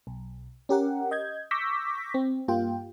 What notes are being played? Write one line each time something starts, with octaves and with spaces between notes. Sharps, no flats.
B1
C#4 G4 A#4 F#5
D#5 G6 G#6
C#6 D6 E6 G6 A#6 B6
C4
G2 A#3 F4 G4 G5